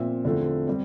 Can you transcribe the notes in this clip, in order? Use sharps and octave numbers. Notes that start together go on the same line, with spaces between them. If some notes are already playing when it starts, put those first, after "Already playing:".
Already playing: A#2 F3 C4 E5
E2 D3 F3 A3 C4
G3 C4